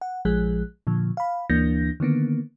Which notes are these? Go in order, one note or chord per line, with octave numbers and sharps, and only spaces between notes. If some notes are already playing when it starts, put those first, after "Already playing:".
F#5
A#1 F3 G#3 G#4 F#6
A#2 D3 F3
F5 B5
D2 E3 A#3 D4 G6 A#6
D3 D#3 A#3 B3